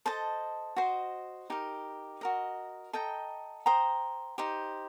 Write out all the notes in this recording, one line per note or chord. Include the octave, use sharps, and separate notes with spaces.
A4 C5 D#5 A5
F#4 C5 D#5
D#4 G4 A#4
F#4 A#4 D#5
A4 D#5 G5 A#5
C5 G5 A#5 D#6
D#4 G4 C5